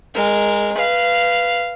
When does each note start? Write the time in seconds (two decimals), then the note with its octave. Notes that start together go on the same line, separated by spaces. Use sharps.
0.14 G#3 A#4
0.77 B4 F5